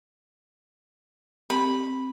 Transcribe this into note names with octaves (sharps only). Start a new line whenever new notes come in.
C4 G4 B5